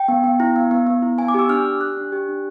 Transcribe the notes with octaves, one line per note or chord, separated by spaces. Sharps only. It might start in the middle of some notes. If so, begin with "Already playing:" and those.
Already playing: G5
B3
B3
E4
B3
B3
B3
E4
B3 G#5
D6
G4 E6
D4 F6
G4
G4 F#6
D4
G4
D4